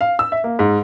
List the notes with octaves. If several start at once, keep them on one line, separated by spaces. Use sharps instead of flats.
F5
E6
E5
A#3
G#2